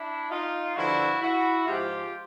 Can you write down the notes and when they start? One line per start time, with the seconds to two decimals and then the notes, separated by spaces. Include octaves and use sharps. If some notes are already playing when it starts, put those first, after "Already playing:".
Already playing: D4 E4
0.32 D#4 F4
0.76 G2 D3 F3 E4 F#4
1.22 E4 F#4
1.67 G#2 F3 F4 G4